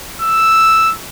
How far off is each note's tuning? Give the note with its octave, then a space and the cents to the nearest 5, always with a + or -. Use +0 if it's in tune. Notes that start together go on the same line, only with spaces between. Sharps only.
E6 +0